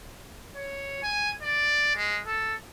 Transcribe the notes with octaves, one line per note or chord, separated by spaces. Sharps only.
C#5
G#5
D5
G#3
A4